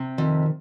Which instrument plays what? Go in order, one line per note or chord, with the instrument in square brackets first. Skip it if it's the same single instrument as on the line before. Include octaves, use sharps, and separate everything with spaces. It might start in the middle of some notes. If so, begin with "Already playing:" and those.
Already playing: [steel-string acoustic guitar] C3
[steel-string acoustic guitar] F2 [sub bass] D#3